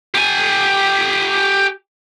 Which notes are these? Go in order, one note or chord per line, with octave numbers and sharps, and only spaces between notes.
G4 G#5